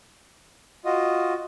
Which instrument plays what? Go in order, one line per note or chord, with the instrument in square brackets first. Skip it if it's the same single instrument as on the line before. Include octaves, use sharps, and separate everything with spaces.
[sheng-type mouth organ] F4 F#4 D#5